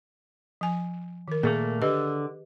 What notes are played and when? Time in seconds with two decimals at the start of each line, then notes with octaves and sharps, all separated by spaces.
0.61 F3 G#5
1.28 D#3 A#4
1.43 A#2 A3 A#3 G#4
1.82 D3 G4 B4 D#5